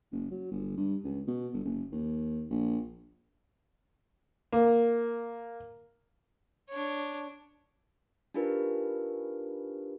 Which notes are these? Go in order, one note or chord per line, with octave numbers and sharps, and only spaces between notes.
F#1
F#3
G1
G2
C#2
B2
G1
F#1
D#2
A#1
A#3
D4 C#5
D4 D#4 F4 G4 A#4 B4